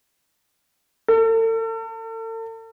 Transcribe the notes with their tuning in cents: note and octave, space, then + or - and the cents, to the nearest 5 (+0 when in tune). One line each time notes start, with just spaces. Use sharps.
A4 +40